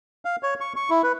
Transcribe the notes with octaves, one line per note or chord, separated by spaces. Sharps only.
F5
C#5
C#6
C#6
E4
B4